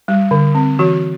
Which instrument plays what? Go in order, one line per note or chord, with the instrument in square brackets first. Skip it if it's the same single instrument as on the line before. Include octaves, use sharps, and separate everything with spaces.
[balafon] G3
D3
C4
E3 F#4